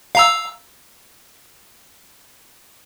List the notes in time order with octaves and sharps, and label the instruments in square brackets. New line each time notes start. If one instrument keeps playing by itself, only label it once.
[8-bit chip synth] F5 A#5 E6